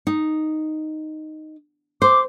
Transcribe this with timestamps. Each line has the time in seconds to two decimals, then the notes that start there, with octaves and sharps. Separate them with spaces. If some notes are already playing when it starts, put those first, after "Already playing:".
0.07 D#4
2.02 C5 D6